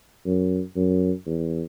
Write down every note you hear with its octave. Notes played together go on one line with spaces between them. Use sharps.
F#2
F#2
E2